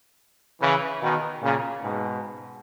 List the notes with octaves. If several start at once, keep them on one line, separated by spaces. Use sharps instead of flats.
C#3 E3
B2 D#3
A#2 C#3
G#2 B2